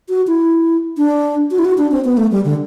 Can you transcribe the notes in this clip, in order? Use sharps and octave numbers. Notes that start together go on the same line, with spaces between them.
F#4
E4
D4
F#4
E4
F#4
D4
C4
B3
A3
G3
D3